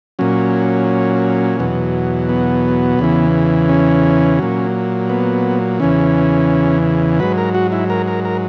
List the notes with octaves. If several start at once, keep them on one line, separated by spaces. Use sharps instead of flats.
A#2 F#3 C#4
E2 B2 F#3
B3
E2 C#3 E3
C#4
A#2 F#3
B3
E2 C#3 E3 C#4
G#2 F#3 B4
A#4
F#4
E4
A#4
A#4
A#4